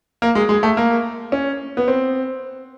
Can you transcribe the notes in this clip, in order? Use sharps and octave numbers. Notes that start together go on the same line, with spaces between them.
A#3
G#3
G#3
A3
A#3
C#4
B3
C4